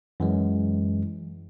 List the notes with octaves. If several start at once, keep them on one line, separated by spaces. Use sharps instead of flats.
F#2 E3 G#3